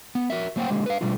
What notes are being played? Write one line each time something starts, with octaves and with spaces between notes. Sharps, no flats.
B3
F#4 A#4 E5
F#3 A#3 C5 F#5 G5
D3 G#3 A#3 G4
B4 F5
B2 G3 A3 D4 F4